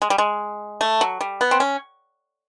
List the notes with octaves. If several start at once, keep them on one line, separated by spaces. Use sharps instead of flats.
G#3
G3
G#3
A3
F#3
G3
B3
C4
C#4